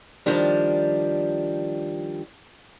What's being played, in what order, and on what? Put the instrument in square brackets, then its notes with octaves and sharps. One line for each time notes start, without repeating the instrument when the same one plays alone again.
[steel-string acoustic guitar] D#3 F3 G3 D4